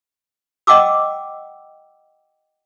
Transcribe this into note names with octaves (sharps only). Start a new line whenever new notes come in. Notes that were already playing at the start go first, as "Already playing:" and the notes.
D#5 F#5 G5 A5 D6 E6